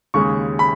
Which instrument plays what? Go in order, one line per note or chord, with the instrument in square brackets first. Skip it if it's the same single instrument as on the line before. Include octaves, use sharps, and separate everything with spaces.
[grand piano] D#2 C#3 G#3 C#6
B5